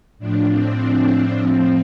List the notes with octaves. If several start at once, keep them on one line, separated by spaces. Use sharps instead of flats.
A2 F3 D4
C4
D4
A2 F3 C4